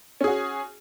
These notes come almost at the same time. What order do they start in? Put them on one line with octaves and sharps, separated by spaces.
C#4 G#4 F#4